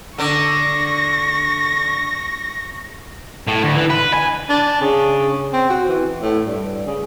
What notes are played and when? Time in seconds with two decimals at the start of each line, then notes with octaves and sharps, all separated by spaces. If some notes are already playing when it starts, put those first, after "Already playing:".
0.18 D3 D4 C#6 A#6
3.47 A2
3.63 D2
3.75 E3
3.90 B4
4.14 G#5
4.49 D4
4.81 C#3
5.53 C4
5.70 F#4
5.88 E3
6.21 A2
6.46 G2
6.86 C#3